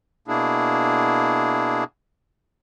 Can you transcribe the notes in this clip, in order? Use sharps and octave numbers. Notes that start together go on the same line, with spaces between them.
B2 A#3 D4 E4 G#4